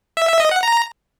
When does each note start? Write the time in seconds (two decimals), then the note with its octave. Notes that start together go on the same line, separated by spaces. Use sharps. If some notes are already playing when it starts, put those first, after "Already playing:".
0.17 E5
0.28 E5
0.40 D#5
0.51 F#5
0.63 A#5